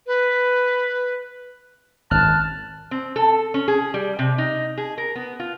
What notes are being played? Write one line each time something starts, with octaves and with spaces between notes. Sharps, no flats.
B4
G#1 F#2 A5 F6 F#6
C4
A4
C#4
G#4
G3
C3
D#4
G#4
A#4
B3
F4